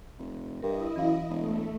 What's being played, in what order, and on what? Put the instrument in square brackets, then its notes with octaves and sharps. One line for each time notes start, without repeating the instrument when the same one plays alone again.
[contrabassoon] F1
[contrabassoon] G2 [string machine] E4 D#5 [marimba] A#4
[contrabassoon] F#2 [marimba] E3 F5
[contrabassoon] E1 [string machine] A3